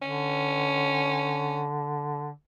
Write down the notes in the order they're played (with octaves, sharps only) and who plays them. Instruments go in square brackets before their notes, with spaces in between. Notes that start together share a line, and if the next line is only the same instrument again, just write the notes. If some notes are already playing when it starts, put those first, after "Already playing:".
[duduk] D3 [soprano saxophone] C#4